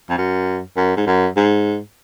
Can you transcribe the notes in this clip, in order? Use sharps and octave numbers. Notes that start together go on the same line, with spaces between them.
F2
F#2
F#2
G#2
F#2
G#2